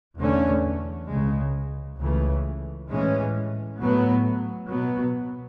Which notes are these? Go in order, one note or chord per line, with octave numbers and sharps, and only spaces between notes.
E2 D3 A3 C#4
C#2 C#3 G#3
C#2 C#3 E3 A3
A2 E3 G#3 C#4
A2 F#3 B3
B2 F#3 B3